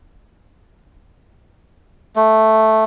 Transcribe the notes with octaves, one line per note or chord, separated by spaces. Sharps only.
A3